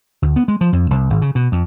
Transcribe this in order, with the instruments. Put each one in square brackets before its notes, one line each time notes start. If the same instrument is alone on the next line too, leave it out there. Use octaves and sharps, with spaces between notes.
[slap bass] D2
B3
G#3
F3
F2
C2
G#1
C#3
B2
F2